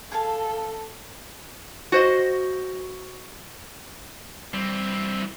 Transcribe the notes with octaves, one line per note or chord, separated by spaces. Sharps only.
G#4 A4 F5 A5
F#4 C5 D#5
E3 G3 C4